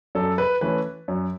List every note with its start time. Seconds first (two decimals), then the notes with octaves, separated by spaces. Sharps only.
0.15 F#2 A4
0.38 B4
0.61 E3 A3 C#4 B4
1.08 F#2